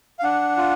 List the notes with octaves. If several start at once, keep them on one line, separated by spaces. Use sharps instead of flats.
F5
D4 F#5
F4